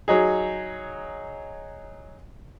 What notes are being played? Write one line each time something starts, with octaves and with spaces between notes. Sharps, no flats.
F#3 D#4 G#4